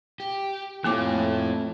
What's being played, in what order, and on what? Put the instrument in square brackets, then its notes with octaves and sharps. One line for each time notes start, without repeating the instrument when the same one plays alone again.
[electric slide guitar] G4
[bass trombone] A2 [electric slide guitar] F3 C4 [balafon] A#3 G#5 D6